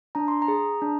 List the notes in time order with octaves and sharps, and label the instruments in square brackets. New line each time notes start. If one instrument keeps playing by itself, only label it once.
[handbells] D4 A#5
C6
A#5
G#4
D4